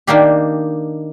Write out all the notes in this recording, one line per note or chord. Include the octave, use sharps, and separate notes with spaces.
D#3 A#3 D4 G4